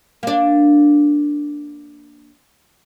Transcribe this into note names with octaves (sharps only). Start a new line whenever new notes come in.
A#3 D4